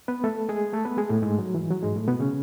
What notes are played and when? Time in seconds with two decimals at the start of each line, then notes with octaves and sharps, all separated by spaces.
0.08 B3 B4
0.24 A3 A4
0.49 G#3 G#4
0.73 A3 A4
0.85 B3 B4
0.97 G#3 G#4
1.09 A2 A3
1.22 G#2 G#3
1.39 F#3
1.55 E3
1.71 F#3
1.83 G#2 G#3
1.96 A2 A3
2.08 B2 B3
2.20 C#3 C#4